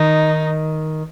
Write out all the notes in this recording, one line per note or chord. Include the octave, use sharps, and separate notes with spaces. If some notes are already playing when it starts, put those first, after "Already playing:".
Already playing: D#3 D#4